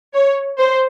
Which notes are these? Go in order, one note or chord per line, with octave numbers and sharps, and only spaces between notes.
C#5
C5